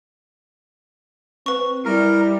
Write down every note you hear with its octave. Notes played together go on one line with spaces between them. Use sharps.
C4 B4 C#6
G3 E4 A#4